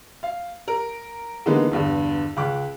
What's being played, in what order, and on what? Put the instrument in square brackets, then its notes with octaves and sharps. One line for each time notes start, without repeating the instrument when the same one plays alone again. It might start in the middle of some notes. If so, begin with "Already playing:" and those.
[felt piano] F5
A#4
D3 E3 G#3 A#3 B3 D#4
E2 G2 D3
C#2 D6 F#6